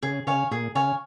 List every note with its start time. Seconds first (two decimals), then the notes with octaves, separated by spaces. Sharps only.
0.03 C#3 G#4
0.27 C#3 C#5 F5 G#5
0.51 A#2 G#4
0.75 C#3 C#5 F5 G#5